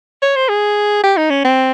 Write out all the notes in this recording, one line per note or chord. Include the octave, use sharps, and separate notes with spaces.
C#5
C5
G#4
G4
D#4
C#4
C4